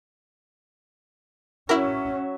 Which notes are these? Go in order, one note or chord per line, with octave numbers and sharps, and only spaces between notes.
F#3 C#4 E4 A#4 E5